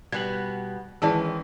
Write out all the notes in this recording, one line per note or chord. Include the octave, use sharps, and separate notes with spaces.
B2 G3 B3 G#6 F#7
D#3 E3 G#3 C#4 D5 A5 E6